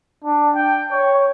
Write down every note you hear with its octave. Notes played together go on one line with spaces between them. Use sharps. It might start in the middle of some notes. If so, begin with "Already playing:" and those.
D4
G5
C#5